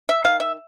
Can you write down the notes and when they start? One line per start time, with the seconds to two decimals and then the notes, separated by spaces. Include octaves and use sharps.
0.09 E5
0.24 D#3 F5
0.40 E5